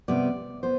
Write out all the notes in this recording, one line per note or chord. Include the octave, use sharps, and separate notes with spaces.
C3 G3 B3 D5
B3 C5